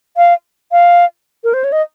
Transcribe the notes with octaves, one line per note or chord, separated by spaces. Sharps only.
F5
F5
A#4
C5
C#5
D#5